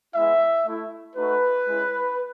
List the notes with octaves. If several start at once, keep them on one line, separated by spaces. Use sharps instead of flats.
G#3 B3 E4 E5
A3 E4
A3 D#4 F#4 B4
G#3 C#4 E4